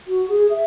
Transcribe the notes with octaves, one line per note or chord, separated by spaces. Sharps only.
F#4
G#4
E5